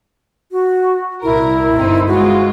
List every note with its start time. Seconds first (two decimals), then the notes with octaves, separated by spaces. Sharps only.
0.52 F#4
1.23 C2 E4 A#4
1.73 G1 C4 D#4
2.07 G#3 F4 F#4